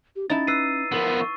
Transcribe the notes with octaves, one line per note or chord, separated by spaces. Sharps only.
G4
C#4 D#4 E4 A5 A6
B4 E6 C7 D#7
F3 B3 A#4
C#6